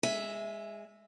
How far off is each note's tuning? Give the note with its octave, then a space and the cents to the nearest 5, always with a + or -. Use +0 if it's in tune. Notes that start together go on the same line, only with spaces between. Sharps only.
G#3 -20 E5 +0 G#5 +15